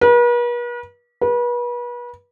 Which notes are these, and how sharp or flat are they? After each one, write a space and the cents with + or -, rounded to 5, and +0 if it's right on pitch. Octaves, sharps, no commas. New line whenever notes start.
B4 -45
B4 -35